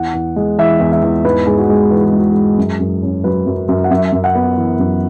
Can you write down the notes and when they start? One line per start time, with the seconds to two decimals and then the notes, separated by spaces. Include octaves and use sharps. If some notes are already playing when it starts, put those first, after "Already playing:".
Already playing: E2 F#5
0.14 E2
0.36 G#3
0.58 E3 E5
0.80 E2
0.92 E5
1.03 E2
1.25 G#2 B4
1.47 G#2 G#4
1.58 F#4
1.69 G#3
1.91 E3 B4
2.04 G#4
2.13 G#2
2.18 F#4
2.31 G#2 G#4
2.58 F#2
2.80 F#2
3.02 C#4
3.24 F#3 B4
3.46 F#2
3.69 F#2
3.84 F#5
3.91 F#2 E5
4.12 F#2
4.24 F#5
4.35 B3
4.57 E3
4.79 F#2